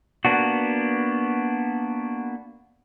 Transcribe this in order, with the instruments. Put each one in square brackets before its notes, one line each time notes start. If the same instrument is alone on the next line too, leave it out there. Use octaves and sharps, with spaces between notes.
[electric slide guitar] A#3 B3 D4 F#4